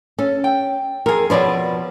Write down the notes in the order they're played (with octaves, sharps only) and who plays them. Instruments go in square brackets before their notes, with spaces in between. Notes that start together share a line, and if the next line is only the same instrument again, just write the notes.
[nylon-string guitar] C#4 [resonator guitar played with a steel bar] A4
[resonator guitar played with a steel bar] G5
[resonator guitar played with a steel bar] F2 G#4 [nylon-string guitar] A#4
[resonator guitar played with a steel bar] F2 B2 F3 [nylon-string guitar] B4 C#5 D5